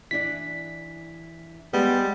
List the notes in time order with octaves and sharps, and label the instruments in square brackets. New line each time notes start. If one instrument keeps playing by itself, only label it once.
[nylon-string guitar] E3 D4 D5 [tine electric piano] B6
[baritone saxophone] G3 [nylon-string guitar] G#3 [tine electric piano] B3